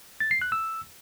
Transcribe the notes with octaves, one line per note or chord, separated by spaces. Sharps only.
A6
C7
F#6
E6